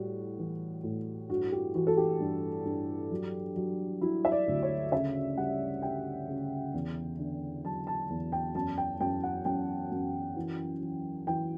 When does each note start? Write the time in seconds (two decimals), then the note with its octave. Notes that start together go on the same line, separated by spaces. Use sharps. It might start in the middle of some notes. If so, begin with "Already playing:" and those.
Already playing: A2 G3 F#4
0.39 E3
0.84 A2
1.29 G2 F#4
1.52 G4
1.75 E3 F#4
1.87 A4
1.97 G4
2.20 G2
2.65 G2
3.11 F#3
3.56 F#3
4.01 F#3 E4
4.25 E5
4.32 D5
4.48 D2
4.63 C#5
4.92 C#3 E5
5.37 G3 F#5
5.82 G3 G5
6.28 C#3
6.74 E2
7.19 D3
7.65 F#3 A5
7.87 A5
8.10 E2
8.32 G5
8.54 F#2 A5
8.78 G5
9.00 F#2 G5
9.23 F#5
9.45 F#2 G5
9.91 F#2
10.37 E3
10.81 E3
11.27 E3 G5